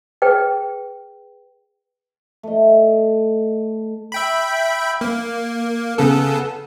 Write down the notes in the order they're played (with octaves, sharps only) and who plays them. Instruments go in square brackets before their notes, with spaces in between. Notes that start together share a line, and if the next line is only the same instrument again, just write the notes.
[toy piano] G#4 B4 G5
[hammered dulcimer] A3 D#5
[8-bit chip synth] E5 G5 B5
A#3
C#3 B3 A4